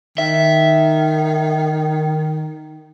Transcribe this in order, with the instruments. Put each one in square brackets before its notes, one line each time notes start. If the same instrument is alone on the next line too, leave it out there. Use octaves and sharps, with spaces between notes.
[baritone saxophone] D#3 [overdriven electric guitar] E5